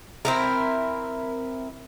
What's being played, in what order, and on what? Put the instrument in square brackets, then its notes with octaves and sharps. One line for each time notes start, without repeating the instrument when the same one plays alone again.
[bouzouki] C4 E4 A#4